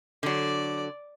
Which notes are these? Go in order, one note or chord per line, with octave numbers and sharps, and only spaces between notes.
D3 F#3 D5